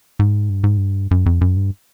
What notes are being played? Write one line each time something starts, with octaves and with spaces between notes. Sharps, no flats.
G#2
G2
G#2
G2
F#2
F2
F#2
G2